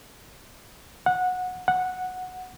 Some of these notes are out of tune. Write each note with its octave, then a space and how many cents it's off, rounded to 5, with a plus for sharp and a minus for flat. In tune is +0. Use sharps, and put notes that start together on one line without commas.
F#5 -20
F#5 -10